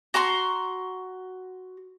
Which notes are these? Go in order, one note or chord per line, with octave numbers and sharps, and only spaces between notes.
F#4 A#5 C6 C#6